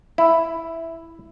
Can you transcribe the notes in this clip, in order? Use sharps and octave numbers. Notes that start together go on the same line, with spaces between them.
E4